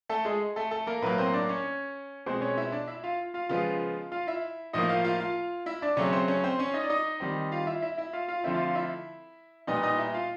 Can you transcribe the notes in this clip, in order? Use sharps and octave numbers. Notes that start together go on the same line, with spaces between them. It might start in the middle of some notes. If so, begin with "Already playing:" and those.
A3 A4
G#3 G#4
A3 A4
A3 A4
A#3 A#4
A2 F#3 A#3 B3 B4
C4 C5
D4 D5
C#4 C#5
B2 G#3 C4 C5
C#4 C#5
E4 E5
D4 D5
E4 E5
F4 F5
F4 F5
C#3 F3 G#3 B3 F4 F5
F4 F5
E4 E5
A2 F3 A#3 D#4 D#5
F4 F5
F4 F5
F4 F5
E4 E5
D4 D5
C#3 F#3 A3 C4 C#4 C#5
C4 C5
C#4 C#5
C4 C5
C#4 C#5
D#4 D#5
D5
D#4 D#5
D#3 G3 C4
F4 F5
E4 E5
E4 E5
E4 E5
F4 F5
F4 F5
D3 F3 A3 C4 E4 E5
F4 F5
F4 F5
E4 E5
A#2 G3 B3 D#4 D#5
D#4 D#5
E4 E5
F4 F5